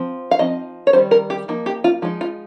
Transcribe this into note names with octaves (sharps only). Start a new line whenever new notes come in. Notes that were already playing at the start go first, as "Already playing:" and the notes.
Already playing: F3 C4
F5
F3 C4 D#4 D#5
C#5
D#3 G3 C#4 C5
A#4
G4
F3 A#3 D#4
G4
F4
F3 G#3 D#4
F4